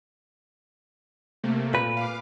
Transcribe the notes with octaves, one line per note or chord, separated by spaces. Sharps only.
C3 A3 A#3
A#2 B4
F5 D6